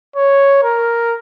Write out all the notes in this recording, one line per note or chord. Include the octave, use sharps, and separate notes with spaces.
C#5
A#4